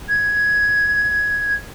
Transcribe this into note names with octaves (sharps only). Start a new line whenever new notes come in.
G#6